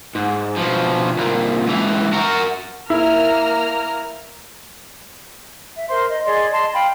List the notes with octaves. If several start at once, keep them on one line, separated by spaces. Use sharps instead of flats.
G#2
B2 F3
C2 A#2
C#2 E3
F#4 A#4
A#3 E4 A#5 F6
E5
A#4 C5 C6
D#5
G#4 D5 D#5 C6
D#5 A5 C6
F5 G5 B5